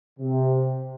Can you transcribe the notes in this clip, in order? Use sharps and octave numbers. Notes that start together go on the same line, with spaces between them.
C3